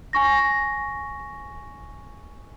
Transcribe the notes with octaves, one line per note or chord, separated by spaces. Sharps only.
G#5 C#6 A#6